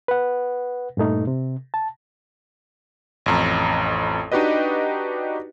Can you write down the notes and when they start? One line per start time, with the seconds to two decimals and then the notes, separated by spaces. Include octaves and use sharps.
0.08 B4 F#5
0.97 G2 A#2 A3 D#4
1.27 C3
1.74 A5
3.26 A1 F2 A#5
4.32 D4 D#4 F#4 G4 B4 D#5